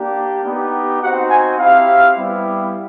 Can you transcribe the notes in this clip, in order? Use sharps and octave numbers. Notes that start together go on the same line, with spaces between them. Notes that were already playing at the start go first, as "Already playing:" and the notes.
Already playing: A#3 D4 G4
B3 D#4 G4
C4 D#4 F#4 F#5
G#5
C4 E4 G4 F5
G3 B3 E4 G4